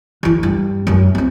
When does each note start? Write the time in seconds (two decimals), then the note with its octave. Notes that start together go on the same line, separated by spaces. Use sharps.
0.23 D3 E3
0.43 G2
0.87 F#2 D4
1.15 A#3 C4